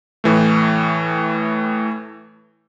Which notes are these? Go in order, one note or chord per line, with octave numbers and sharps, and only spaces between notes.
A2 E3 A3